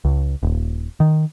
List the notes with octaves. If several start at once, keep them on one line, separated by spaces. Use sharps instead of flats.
C#2
D#1
D#3